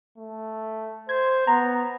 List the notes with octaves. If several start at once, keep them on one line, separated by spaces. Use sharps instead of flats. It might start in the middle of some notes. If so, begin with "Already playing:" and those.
A3
C5 G#6
B3 A#5